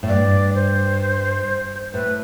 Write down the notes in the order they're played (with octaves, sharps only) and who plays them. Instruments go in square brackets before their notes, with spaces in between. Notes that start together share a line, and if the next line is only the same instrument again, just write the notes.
[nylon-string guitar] A2
[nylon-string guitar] G2 [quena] D5
[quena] C5
[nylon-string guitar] A2 [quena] B4